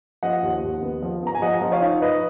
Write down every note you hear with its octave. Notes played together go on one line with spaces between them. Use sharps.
F3 D#5 F#5
D#2
D#2
B3
F3
B3 A#5
G#5
F3 D#5 F#5
F3
C#5 F5
D#4
D#4 B4 D#5